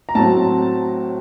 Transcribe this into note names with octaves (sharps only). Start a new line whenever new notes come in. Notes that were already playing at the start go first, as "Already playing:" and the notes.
A#5
A2 F#3 C4 A5